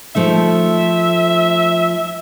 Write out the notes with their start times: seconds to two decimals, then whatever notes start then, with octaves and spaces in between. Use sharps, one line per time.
0.15 F3 A3 D#4 E5